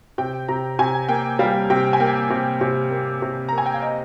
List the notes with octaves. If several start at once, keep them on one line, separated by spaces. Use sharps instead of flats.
C3 G5
C3 A#5
C3 G#5
A#3 G5
G3 F5
C3 G5
G#5
A#3 G5
C3
C3
A#3
C3
A#5
A#3
G#5
G5
F5
D#5